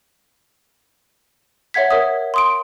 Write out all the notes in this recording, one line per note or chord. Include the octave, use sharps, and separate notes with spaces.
C#5 E5 F#5 G#6 B6
A#4 C#5 E5 D#6
C6 D#6 D7